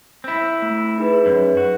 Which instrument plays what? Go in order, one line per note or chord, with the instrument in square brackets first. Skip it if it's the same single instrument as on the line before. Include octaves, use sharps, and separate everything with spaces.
[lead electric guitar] C4 E4
[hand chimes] A3
D#4 G#4 B4
[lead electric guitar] F#2
F#4